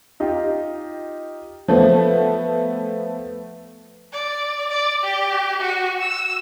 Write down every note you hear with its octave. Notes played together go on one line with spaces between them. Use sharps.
D#4 F4 G4
F3 A3 B3
D5
D5
G4
F#4
E6